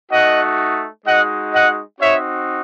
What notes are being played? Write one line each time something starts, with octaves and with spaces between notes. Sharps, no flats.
A3 D#4 F#4 D#5 F#5
G#3 D#4 F#4 D#5 F#5
D#5 F#5
C4 D#4 F#4 C#5 E5